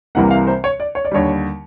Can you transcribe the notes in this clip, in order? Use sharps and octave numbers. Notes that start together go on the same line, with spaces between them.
C2 C3 E3 G3 A#3 F#5
F5
C5
C#5
D5
C#5
D5
D#2 D3 G3 C#5